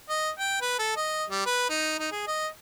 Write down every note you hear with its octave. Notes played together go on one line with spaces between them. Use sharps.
D#5
G5
B4
A4
D#5
G3
B4
D#4
D#4
G#4
D#5